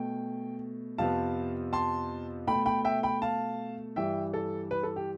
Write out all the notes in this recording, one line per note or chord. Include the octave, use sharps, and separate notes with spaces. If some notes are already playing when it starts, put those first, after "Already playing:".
Already playing: B2 A3 G5
F2 C3 F3 B3 F5 A5
A5 C6
B2 A3 G5 B5
G5 B5
E5 G5
G5 B5
F5 A5
G2 E3 G3 E5 G5
A4
B4
A4
G4